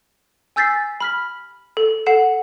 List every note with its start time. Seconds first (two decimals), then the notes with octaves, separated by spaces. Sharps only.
0.56 G#5 E6 G6 A6 B6 C7
1.00 B5 F6 B6
1.77 A4
2.06 A4 F#5 C7 E7